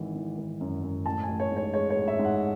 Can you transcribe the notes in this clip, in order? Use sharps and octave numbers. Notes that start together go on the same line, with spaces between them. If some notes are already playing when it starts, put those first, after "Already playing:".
Already playing: G#1 E3
E3
G#1
F#2
F#2
A1 A5
G#5
A1
C#5
G#2
C#5
G#3 C#5
C#5
A1
E5
G#2
F#5